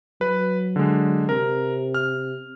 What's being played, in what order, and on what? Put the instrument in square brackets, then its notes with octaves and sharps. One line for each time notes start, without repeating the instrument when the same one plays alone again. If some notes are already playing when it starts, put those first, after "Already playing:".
[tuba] F#3 [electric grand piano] B4
[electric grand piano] D3 G#3
[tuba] C3 [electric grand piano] A#4
[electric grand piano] F6